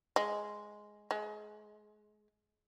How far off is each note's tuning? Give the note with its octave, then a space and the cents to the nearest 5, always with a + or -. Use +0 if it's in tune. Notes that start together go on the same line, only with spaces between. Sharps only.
G#3 +5
G#3 +25